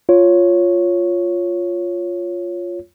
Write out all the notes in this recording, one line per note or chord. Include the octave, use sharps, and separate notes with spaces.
F4 C#5